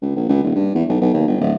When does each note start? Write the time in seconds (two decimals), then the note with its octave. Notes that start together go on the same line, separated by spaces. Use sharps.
0.02 C#2
0.16 A#1
0.29 C#2
0.44 D#1
0.55 G2
0.75 E2
0.89 B1
1.01 B1
1.14 D#2
1.27 G1
1.41 D1